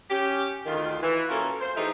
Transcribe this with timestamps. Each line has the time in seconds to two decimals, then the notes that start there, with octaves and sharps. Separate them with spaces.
0.10 C#4 G4
0.66 D2 D#3 F4
1.02 E3
1.28 A#3 C#4 F4 F#4 A4 A#4
1.61 C5
1.76 E3 F3 A3 D#4 G4 G#4